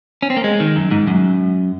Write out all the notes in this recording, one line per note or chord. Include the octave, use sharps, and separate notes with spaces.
C#4
C4
A#3
G#3
D#3
F#2
G#2
F#2